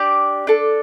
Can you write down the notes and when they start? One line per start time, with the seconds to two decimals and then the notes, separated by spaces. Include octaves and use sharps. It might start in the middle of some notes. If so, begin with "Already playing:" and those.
Already playing: D4 G4 D5
0.47 D4 A4